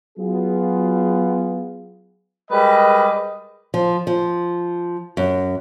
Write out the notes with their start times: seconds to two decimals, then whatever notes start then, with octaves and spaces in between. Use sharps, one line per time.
0.18 F#3 B3 F4 G#4
2.51 G3 G#3 A#4 B4 D#5
3.74 F3
4.07 F3
5.17 F#2